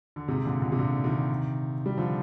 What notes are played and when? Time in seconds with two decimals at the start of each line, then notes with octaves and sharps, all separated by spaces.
0.16 D3
0.28 G#2 C3
0.45 A#2 D3
0.62 A#2 D3
0.72 C3
0.79 A#2 D3
1.04 C3 D#3
1.86 G3
1.98 D3 F3